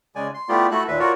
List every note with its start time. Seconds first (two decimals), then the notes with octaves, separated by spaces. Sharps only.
0.16 C#3 G#3 D5 G#5
0.34 C6
0.49 A3 B3 E4 F4 G4 D5
0.71 A3 E4 F#4 A4 F#6
0.88 D#2 A#2 B4 E5
1.00 F4 F#4 A#4 C#5 D5